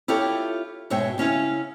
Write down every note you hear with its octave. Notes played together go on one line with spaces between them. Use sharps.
E4 F4 G4 A4 C#5
G#2 B2 C#5 E5 G5
C#3 C#4 E4 F5